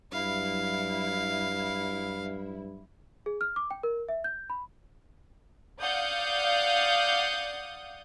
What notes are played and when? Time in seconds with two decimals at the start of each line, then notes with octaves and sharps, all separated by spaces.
0.13 G2 F#3 E4 F5
3.26 G#4
3.41 F6
3.56 D6
3.71 G5
3.83 A#4
4.09 E5
4.24 G6
4.50 B5
5.80 D5 F5 F#5 D#6 G6